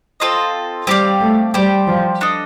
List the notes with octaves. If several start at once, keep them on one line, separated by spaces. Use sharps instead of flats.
C4 F4 A4 D#5
G3 C4 G4 D5 F5
A3
G3 G4 C5 G5
F3
D4 A4 D#5